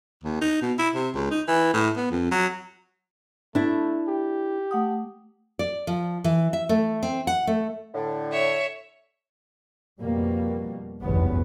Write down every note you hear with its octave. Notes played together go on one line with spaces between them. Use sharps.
D#2
D#4
B2
E4
C3
C#2
D#4
E3
A2
B3
F2
F#3
A3 D4 E4
G4
A3 F#5 D#6
D5
F3
E3
E5
A3
C4
F#5
A3
A2 D3
C#5 E5
F2 B2 G3 A#3
F1 B1 E2 G2 C#3 B3